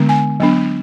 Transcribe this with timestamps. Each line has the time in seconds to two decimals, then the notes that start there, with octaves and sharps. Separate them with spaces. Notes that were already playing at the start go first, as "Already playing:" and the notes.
Already playing: D3 G#3 B3 D4
0.09 G#5
0.40 F#3 B3 D4